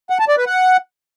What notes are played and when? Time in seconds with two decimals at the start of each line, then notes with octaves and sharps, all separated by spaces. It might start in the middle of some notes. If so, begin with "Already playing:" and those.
0.10 F#5
0.19 A5
0.28 D5
0.37 B4
0.47 F#5